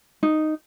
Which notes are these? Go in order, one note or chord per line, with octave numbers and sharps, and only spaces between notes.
D#4